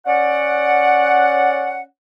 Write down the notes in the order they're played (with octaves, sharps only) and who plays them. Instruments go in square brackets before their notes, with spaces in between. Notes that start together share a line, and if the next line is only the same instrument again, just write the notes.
[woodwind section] C#4 D5 F#5